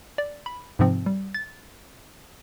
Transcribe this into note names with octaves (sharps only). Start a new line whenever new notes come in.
D5
B5
G#2 C3 F3 C4
G3
A6